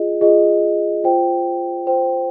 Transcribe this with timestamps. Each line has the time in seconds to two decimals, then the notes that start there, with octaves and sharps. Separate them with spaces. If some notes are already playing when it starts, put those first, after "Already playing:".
Already playing: F4 G#4 D#5
0.21 F4 G#4 D#5
1.04 F4 C5 G5
1.86 F4 C5 G5